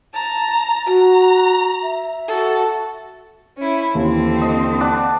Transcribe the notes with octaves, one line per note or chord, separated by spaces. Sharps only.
A5 A#5
F#4 A#5
E5
F#4 A4
C#4 E4
D#2 D3 E3 C4
D#5
D5 F#5 A5